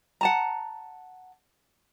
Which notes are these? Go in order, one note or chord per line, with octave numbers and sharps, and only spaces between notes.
F#5 A5 A#5